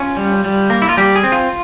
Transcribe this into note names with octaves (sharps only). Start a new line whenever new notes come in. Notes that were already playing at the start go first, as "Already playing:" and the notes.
Already playing: C#4 F4
G3
G3
A#3
E4
F4
G3 G4
G#4
C4
F4